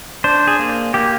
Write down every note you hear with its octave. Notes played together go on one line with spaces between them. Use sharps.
D4 C5
G#4
A#3
A#3 G4